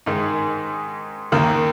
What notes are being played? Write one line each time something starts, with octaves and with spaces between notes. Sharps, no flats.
G#2 D#3 G#3 D#4
D#2 D#3 A#3